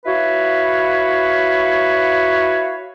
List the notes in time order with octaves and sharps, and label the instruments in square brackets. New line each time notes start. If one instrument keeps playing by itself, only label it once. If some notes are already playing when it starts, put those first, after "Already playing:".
[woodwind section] E4 F#4 B4 C#5 F5